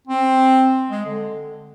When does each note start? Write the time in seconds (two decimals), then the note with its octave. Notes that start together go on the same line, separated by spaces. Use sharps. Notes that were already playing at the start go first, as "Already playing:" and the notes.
0.07 C4
0.90 G#3
1.06 D3